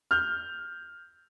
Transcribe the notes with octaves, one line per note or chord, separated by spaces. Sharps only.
F6 G6